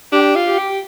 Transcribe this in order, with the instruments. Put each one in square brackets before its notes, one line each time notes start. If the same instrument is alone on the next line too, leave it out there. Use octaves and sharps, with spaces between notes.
[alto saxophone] D4 [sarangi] G4
[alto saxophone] F4
[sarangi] G4
[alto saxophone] G4